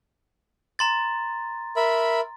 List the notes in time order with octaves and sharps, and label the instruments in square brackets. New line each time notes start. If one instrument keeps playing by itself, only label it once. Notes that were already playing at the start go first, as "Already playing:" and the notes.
[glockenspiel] A#5 C6 A6
[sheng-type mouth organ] A#4 E5 B5